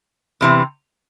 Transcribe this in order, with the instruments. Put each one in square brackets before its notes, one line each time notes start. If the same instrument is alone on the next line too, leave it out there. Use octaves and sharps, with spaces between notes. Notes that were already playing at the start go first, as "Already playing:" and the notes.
[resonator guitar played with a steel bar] E2 C3 E3